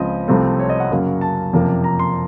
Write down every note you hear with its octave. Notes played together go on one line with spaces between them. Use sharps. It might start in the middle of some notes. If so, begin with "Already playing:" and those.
Already playing: C#2 C#3 F3 C4 D#5
C2 C3 F3 A3 C4
C#5
D#5
F#5
F#2 C#3 F#3 A#3
A5
F#1 F2 C3 F3 A#3
A#5
C6